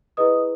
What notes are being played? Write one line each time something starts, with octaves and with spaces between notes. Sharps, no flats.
E4 G#4 B4 D#5 D#6